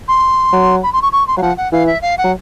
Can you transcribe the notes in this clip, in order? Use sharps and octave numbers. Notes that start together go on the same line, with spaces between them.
C6
F#3
B5
C6
C#6
C#6
C6
F#3 F5
F3 F#5
F#5
E3 F5
E5
F5
F#5
F#3